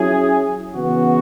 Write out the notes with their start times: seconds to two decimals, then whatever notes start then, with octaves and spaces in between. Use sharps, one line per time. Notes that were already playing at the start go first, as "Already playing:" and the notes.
Already playing: F#3 C#4 E4 G#4
0.73 C#3 E3 B3 F#4